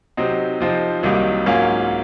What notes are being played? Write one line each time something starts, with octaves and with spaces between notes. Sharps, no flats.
C3 F#3 C4 D#4
C3 F3 C4 D#4
C2 C3 D#3 F#3 A#3
G#2 F#3 A#3 C#4 F4